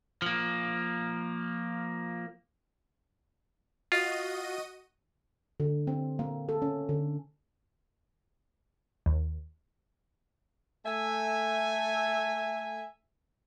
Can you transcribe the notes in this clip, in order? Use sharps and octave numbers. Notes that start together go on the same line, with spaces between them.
F3 A#3
F4 F#4 D#5 D#7
D3
C4
A#3
A4
C#4
D3
D#2
A3 E5 G#5